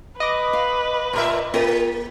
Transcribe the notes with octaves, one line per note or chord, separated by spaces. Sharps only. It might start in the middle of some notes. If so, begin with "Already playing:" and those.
B4 D#5 D6
F5
A2 A#4 E5
A#3 F4 G#4 A#4